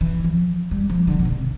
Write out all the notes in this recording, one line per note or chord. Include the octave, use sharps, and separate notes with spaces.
E3
F3
G3
F3
D3
B2
C3